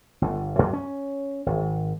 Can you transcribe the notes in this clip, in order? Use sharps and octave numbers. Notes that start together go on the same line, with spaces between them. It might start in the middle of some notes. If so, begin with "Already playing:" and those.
G1
F#2
C#4
G#1